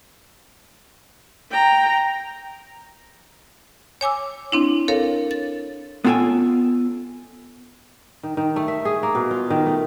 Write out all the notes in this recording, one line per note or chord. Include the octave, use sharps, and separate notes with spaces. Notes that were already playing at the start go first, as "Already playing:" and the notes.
G5 A#5
C#5 G#5 D6 E6
C4 D4 E4
A4 A#4 C#5 F5
A6
B3 C#4 F4 A4 G5 G#5
D#3
D#3
A3
E5
G#4
A#3
B2
F4
D#3
A3